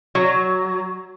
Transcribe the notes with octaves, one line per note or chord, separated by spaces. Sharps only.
F#3